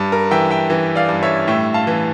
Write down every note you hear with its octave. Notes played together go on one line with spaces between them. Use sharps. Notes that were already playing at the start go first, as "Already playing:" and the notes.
Already playing: G2
A#4
E3 E5 G5
E5 G5
E3
D5 F5
G2
C#5 E5
A2 E5 G5
F5 A5
E3